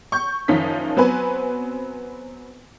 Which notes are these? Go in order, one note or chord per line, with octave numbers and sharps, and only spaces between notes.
C#6 G6
F#1 D#3 F3 C#4 D#4 B6
F#3 B3 C4 B4 G#5